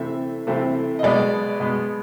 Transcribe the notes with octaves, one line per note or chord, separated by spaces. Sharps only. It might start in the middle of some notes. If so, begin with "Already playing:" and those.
Already playing: C3 E3 A3 C4 E5
C3 E3 A3 C4
D#5
B2 G#3 B3 D5
B2 G#3 B3